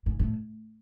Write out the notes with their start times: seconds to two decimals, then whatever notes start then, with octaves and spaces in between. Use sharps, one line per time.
0.06 G#2
0.19 A2